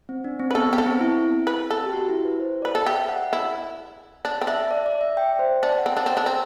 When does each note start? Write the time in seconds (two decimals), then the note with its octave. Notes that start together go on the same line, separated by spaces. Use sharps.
0.09 C4
0.24 D4
0.39 C4
0.51 B4
0.55 B3 A4
0.71 B3 G4
0.78 A4
0.86 C4
1.01 E4
1.47 B4
1.70 A4
1.86 G4
1.93 F#4
2.09 E4
2.25 B4
2.39 C5
2.62 D5
2.65 B4
2.75 A4
2.86 G4 E5
3.09 F#5
3.33 E4
4.25 D4
4.41 C4
4.47 D4 E5
4.71 D5
4.86 D5
5.01 E5
5.17 G5
5.39 C5
5.63 D4 D5
5.78 F#5
5.86 C4
5.97 D4
6.06 C4
6.17 D4
6.26 C4